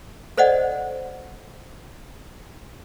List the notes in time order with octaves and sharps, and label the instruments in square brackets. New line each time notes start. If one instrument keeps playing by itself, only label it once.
[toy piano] A4 C5 D5 D#5 F#5